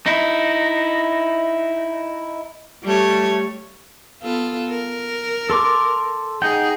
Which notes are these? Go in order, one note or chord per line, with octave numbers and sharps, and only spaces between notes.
D#4 E4
G3 A3 C#5
B3 F4 A4
A#4
A4 C6 D6
D#4 G#4 F#5 G5